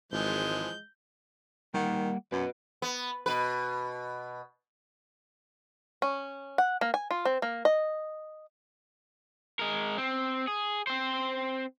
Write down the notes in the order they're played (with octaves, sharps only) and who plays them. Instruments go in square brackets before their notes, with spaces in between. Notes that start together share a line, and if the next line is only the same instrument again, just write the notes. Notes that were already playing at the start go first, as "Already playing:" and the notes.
[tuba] G#1 [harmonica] E3 F3 [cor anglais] G#3 [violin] G6
[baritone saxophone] D#3 [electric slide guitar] G3 A#3 F#5
[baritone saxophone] F#2 [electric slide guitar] F#4 B4
[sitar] B3
B2 B4
[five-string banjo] C#4
F#5
A#3
G#5
F4
C4
A#3
D#5
[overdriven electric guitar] G#3 A#4
C4
G#4
C4 C5